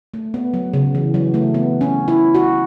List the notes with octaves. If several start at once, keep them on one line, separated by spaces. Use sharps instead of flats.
A3
B3
F#3
C#3
E3
F#3
A3
B3
C#4
E4
F#4